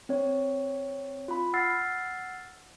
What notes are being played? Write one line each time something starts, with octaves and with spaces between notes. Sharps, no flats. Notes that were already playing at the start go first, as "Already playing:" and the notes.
C4 C#5
F4 B5
F#5 E6 F6 A6 C7